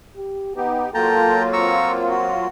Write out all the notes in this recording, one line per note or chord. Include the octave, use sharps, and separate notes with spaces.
G4
B3 D#4 G4
F#3 A#3 F4 A4 G5 A5 A#5
C4 A#5 C#6 E6
F#4